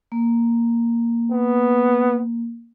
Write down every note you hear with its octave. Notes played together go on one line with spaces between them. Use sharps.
A#3
B3